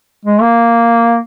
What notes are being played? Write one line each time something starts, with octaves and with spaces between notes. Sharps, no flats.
G#3
A#3